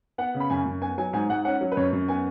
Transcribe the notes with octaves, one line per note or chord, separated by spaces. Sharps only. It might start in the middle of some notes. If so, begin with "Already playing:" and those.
B3 F#5
C#3
B5
F#2 G#5
F#2
B3 G#5
F#3 G#5
G#2 G#5
G#2 F#5
C#4 F#5
F#3
B4
F#2 C#5
F#2
B3 G#5